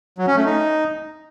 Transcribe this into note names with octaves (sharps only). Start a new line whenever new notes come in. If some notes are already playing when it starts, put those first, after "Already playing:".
F#3
C#4
A3
D#4